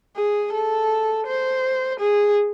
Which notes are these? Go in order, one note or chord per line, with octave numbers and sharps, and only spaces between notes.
G#4
A4
C5
G#4